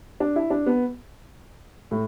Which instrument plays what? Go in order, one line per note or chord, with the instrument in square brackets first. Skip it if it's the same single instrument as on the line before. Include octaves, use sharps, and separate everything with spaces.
[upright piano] D4
E4
D4
B3
A2